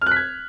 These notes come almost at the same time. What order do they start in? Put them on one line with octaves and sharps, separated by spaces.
F6 F#6 B6 G#6